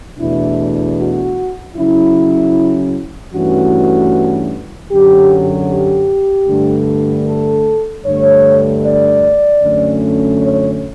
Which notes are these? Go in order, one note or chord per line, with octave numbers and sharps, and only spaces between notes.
E2 B2 A3 D4 E4
F#4
C#3 F#3 C#4 E4
G2 E3 A3 C#4 F#4
F#2 D3 F#3 G4
G4
G2 D3 A3
A4
G2 D3 A3 C#5
D5
F#2 D3 A3 C#4
C#5